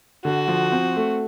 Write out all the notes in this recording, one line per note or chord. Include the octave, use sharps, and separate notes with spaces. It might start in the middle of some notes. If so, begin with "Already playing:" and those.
D3 F#4
F3
C4
A3